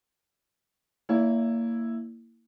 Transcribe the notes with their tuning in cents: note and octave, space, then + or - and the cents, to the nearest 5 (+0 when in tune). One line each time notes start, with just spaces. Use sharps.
A#3 -15 E4 +0 D5 -45